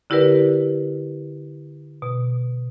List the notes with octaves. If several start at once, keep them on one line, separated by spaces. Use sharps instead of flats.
D3 E4 G4 A#4 B4 D5
B2